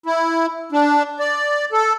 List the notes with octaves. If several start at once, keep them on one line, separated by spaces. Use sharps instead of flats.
E4
D4
D5
A4